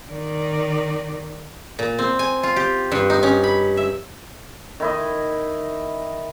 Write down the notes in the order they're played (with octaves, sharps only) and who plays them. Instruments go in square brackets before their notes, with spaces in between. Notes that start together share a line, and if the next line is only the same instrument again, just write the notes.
[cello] D#3 D5
[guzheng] A#2
C4
G#5
F4
G4
G2
D#4
C#4
B5
E5
[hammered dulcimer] D#3 E4 D#5